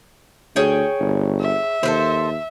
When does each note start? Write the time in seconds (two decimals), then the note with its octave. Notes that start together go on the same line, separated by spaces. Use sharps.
0.56 D2 G#4 C#5 G5
1.00 G1
1.40 E5
1.83 D#2 A4 B4 C5